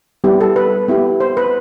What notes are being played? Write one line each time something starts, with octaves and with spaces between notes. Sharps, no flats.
G3 B3 E4 G4
A4
B4
B3 E4 G4
C5
B4